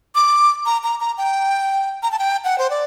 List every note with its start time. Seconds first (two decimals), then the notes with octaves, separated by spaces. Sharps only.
0.15 D6
0.66 A#5
0.83 A#5
1.00 A#5
1.18 G5
2.03 A#5
2.12 A5
2.19 G5
2.44 F#5
2.58 C5
2.70 D5